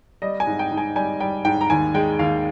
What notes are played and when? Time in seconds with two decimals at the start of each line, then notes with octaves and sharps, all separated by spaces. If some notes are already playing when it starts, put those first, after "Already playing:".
0.22 G3 D#5
0.40 G#5
0.47 G#2
0.59 G5
0.71 G#2
0.78 G#5
0.96 G3 G#5
1.20 G3 G5
1.45 G#2 G5
1.61 A#5
1.70 D#2 G#5
1.94 G#3 G5
2.19 D#2 F5